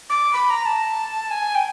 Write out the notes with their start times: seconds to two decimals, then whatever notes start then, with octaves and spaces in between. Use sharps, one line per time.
0.10 D6
0.33 B5
0.50 A#5
0.66 A5
1.31 G#5
1.55 G5